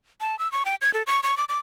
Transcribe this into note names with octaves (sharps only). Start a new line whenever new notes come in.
A5
E6
C#6
G5
G#6
A4
C#6
C#6
D6
D6